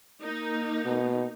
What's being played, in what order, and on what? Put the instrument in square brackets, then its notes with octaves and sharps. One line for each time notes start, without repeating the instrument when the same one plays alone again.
[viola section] A#3 D#4
[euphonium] B2